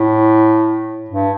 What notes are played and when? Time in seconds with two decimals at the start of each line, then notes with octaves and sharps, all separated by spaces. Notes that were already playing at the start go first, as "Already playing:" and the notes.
Already playing: A2
1.10 G2